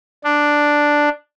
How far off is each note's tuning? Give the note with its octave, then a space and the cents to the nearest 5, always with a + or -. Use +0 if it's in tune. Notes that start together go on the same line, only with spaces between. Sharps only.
D4 +0